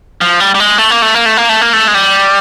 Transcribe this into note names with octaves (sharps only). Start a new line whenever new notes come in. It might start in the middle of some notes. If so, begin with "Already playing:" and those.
F3
G3
G3
G#3
A3
A#3
A3
A#3
A3
A#3
A3
A#3
A3
G#3
G3